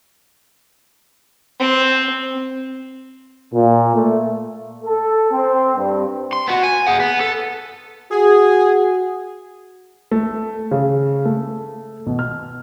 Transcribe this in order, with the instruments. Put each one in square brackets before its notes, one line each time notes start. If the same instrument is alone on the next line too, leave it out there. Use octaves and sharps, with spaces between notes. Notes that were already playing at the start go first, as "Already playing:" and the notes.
[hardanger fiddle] C4
[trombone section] A#2
A3
[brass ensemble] A4
C4
G2
[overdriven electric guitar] C6
B3 F#4
G#5
G#4 F#5
B3
A4
[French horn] F#4 [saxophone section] G#4
[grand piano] A3
C#3
A3
B2
F6